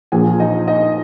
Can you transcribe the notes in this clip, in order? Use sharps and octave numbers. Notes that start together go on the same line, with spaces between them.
A#1 A#2 F3 G#4 G#5
D#4 D#5
D#4 D#5